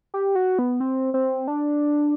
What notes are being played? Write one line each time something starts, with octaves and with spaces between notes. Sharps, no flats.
G4
F#4
B3
C4
C4
D4